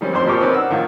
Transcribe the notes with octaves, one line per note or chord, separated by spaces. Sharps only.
D#3 G3 C4 C#4
A1 F2 C5 C6
A#2 F3 G4 A#4 C#6
C4 C#4 D#4 A#4 B4 D5
F#5 E6
A2 D#3 F4